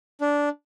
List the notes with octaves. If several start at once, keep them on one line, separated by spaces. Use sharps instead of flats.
D4